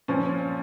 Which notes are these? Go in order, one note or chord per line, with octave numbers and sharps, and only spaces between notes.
A#2 F3 C#4